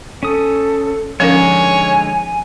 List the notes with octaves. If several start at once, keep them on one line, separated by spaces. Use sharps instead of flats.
C#4 A4 D#6
D3 F3 G#3 C#4 D#4 A#4 C#5 G#5